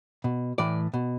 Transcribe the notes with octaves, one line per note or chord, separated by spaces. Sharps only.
B2
A2 E3 D5
B2